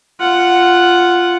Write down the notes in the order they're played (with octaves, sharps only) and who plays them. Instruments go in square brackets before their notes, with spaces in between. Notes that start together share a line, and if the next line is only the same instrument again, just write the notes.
[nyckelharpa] F4 F#5